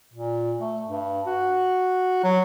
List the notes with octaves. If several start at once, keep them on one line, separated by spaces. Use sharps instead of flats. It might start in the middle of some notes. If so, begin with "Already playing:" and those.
A#2
A3
G2
F#4
F#3